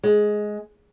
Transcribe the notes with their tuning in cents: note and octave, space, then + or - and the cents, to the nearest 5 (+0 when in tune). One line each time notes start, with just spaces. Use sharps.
G#3 +10